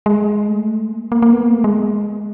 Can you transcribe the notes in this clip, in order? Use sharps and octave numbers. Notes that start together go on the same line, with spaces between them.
G#3
A3
A#3
A#3
A#3
B3
A#3
A3
G#3